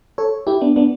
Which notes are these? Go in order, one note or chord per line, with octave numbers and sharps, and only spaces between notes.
A4 C#5
E4 G4
B3 D4
B3 D4